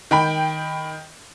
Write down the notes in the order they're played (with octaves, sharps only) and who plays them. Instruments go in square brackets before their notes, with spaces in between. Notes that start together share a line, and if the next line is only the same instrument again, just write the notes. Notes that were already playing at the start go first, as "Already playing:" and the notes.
[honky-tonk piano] D#3 G5 B5